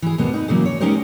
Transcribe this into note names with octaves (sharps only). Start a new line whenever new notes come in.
E3 G#4
D#2 B2 A#3 B3
D#4 B4
A#2 C#3 E3 F#3 A#3
C#5
G#3 C#4 D#4 G4 A#4 C5